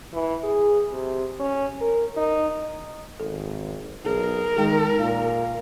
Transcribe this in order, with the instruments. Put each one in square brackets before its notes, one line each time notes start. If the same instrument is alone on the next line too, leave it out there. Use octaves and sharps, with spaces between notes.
[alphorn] E3
G#4
C3
C#4
A#4
D#4
[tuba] G#1 [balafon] A4
[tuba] B1 [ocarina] G#4 [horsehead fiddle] A#4
[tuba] D#3 [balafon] G#3 G5 [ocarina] D#4
[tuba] A#2 [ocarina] F5